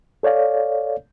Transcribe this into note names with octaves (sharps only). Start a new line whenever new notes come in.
A4 C#5 D5 F5